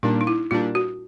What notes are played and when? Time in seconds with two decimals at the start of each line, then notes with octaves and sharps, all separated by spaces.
0.03 A#2 G3 A#3 D4 D#4
0.21 D#4
0.27 E4
0.51 A#2 G3 A#3 D4 F4
0.75 F#4